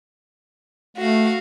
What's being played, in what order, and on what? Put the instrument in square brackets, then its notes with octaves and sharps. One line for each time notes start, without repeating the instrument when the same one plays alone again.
[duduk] A3 [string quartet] F#4 F5